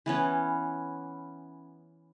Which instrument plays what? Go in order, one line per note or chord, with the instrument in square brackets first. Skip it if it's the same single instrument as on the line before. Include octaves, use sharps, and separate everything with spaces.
[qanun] E3 B3 C#4